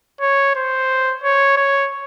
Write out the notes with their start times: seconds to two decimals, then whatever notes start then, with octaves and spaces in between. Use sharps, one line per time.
0.21 C#5
0.55 C5
1.24 C#5
1.57 C#5